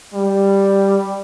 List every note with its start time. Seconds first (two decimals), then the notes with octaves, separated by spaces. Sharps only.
0.14 G3